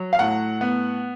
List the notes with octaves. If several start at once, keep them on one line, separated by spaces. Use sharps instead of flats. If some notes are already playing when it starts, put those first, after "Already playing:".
Already playing: F#3
F5
A2 F#5
B3